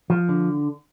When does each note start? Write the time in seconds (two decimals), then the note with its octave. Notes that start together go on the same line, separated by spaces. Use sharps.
0.10 F3
0.29 D3